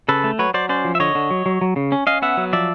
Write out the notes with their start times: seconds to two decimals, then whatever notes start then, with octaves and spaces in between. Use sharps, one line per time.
0.08 C#3 A4 B4
0.24 A3
0.39 F#3 B4 C#5
0.54 F#3 C5 D5
0.69 C#4 C5 D5
0.85 F3
0.95 E5
1.00 D3 C#5 D#5
1.15 D3
1.31 F#3
1.46 F#3
1.61 F#3
1.76 C#3
1.92 C#4
2.07 C#4 D#5 F5
2.22 B3 E5 F#5
2.37 F#3
2.53 F3 D5 E5